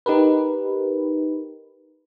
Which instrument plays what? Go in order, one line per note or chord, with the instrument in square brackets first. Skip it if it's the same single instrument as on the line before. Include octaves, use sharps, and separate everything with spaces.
[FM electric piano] D#4 G4 A#4 B4